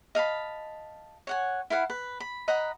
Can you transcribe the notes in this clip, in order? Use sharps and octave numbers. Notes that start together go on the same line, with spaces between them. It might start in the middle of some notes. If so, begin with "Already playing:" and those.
D#5 F5 A5 B5
C#5 F#5 G#5
E4 B4 F5 F#5
B4
B5
D#5 F#5 A#5 B5